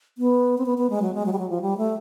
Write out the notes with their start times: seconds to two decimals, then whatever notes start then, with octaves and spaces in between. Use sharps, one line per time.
0.18 B3
0.58 C4
0.66 B3
0.78 B3
0.90 G#3
1.02 F#3
1.14 G#3
1.26 F#3
1.33 G3
1.38 F#3
1.50 F3
1.61 G3
1.77 A3